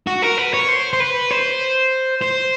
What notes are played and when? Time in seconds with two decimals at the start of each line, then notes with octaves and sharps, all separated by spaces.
0.07 F#4
0.23 A#4
0.38 B4
0.54 C#5
0.68 C5
0.93 C5
1.00 B4
1.31 C5
2.22 C5